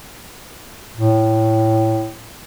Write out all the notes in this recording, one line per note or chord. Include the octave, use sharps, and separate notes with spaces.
A2